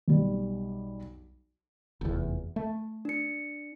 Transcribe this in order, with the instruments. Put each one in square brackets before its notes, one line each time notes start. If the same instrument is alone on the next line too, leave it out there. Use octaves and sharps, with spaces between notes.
[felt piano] B1 G3
[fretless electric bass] F1 E2
A3
[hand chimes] D4 C#7